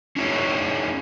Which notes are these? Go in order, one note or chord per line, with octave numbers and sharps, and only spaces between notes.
C#4 D#4 E4 F#4 G#4 C#5